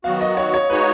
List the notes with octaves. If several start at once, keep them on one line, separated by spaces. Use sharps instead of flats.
D#3 F#3 B3 F#4 F5
D#5
C#5
C#5
G#3 D#4 F#4 B4 C#5